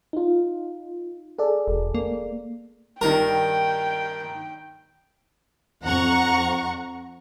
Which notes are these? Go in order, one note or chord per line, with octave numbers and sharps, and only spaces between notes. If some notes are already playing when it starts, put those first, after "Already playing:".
D#4 F4
G#4 A4 D5
E1
A#3
G2 D#3 A#4 G5
F2 F#5 A#5 C#6